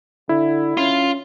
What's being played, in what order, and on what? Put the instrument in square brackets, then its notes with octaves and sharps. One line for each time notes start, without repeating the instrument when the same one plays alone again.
[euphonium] D3 [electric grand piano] E4
[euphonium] C#4 [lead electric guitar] F4